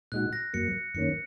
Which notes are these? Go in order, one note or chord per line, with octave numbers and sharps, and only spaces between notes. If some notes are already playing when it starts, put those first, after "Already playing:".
A#2 G#3 D#4 F#4 F#6
A#6
F#2 F#3 A#3 C#7
F#2 D#3 A#3 C#4 C#7